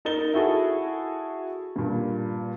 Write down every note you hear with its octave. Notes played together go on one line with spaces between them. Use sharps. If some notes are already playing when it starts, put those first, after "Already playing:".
D#4 A#4 A6 G7
E4 F#4 G#4 A4
G2 A#2